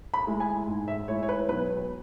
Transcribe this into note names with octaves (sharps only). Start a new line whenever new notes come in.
B5
G#3 E4
G#5
G#2
E5
G#3 E4 C#5
C#5
B4
B1 B4